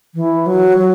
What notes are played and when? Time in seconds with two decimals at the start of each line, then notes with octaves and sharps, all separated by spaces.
0.15 E3
0.46 F#3
0.78 F#3